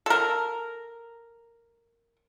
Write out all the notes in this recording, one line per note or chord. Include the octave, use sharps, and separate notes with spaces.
A4 A#4